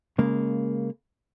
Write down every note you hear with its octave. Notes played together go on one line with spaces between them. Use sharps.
C#3 G#3 A#3